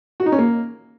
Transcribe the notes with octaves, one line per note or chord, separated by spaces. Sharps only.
F#4
D#4
C#4
A#3